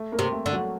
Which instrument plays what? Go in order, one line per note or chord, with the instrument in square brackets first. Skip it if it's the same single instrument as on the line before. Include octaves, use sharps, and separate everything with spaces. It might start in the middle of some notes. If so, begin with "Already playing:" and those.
Already playing: [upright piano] A3 A4
A#3 A#4
[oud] C3
[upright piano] A3 A4
[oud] D3
[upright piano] F#3 F#4